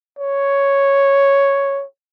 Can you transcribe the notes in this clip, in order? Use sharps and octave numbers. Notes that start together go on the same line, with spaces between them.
C#5